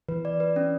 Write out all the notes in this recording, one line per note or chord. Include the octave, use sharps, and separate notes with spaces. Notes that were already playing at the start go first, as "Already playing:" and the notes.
E3 B4
D5
B4
C#4